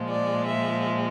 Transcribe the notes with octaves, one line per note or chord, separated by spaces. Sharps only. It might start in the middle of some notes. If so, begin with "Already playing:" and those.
Already playing: A#2 F3 G#3
D5
E5